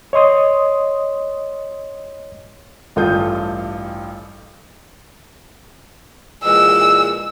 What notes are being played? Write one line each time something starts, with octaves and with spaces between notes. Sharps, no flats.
C#5 D#5 C6 D#6
A1 G2 F4 A4 D#6 G6
A#2 E3 G#3 E6